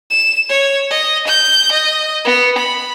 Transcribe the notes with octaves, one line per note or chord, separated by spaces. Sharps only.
E7
C#5
D#5
G6
D#5
B3
B5